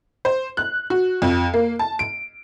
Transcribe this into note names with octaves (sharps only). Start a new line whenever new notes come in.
C5
F#6
F#4
F2
A#3
A5
D7